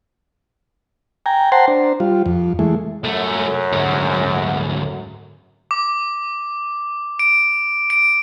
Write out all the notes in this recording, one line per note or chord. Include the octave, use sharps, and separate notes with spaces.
G5 G#5 A#5
C5 F#5 G5 A5 A#5 C6
D4 C5
G3 F4
F2
E3 G#3 A3
C2 F#2 A3
D2 G#2
D6
D7
D7